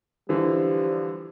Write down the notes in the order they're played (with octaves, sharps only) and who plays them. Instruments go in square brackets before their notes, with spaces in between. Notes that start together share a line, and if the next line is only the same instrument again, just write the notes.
[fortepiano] D3 E3 [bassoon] F3 [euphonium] G3